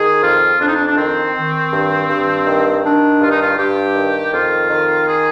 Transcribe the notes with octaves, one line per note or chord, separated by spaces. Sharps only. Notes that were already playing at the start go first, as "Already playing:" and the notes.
Already playing: D#3 G#4
F2 F4
F2 D4
D#4
D4
D4
D#3 C4
D#3
G2
G2
D#3
D#3 D4
G2 F4
D#4
F4
G2 G4
D#3
F2 F4
D#3
G#4